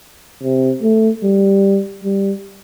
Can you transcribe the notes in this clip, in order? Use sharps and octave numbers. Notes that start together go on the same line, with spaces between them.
C3
A3
G3
G3